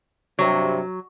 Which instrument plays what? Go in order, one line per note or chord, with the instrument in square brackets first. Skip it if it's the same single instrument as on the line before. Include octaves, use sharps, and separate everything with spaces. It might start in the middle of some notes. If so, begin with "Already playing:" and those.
[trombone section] G2 C3 [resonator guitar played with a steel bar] F#3